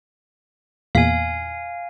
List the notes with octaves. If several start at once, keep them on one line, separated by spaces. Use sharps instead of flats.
E2 A#2 F5 G#5 B6